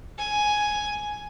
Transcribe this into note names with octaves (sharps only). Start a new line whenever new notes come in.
G#5